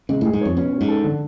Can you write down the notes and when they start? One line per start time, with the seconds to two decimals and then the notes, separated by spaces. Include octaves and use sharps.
0.09 C#3 G#3
0.21 A2 G#4
0.33 G#2
0.41 F2 C#5
0.57 B2 C#4
0.73 C#4
0.81 G#2
0.88 A4
1.04 D3